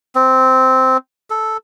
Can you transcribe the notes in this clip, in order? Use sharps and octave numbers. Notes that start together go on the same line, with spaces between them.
C4
A4